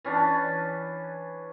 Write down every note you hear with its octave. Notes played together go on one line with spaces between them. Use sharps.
E3 C#4 D4 A5